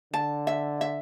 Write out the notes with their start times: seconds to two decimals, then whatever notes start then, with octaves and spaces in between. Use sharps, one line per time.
0.13 D3 A5
0.47 E5
0.81 E5